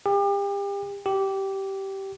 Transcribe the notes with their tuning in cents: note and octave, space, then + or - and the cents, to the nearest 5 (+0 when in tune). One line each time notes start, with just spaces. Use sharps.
G4 +35
G4 -15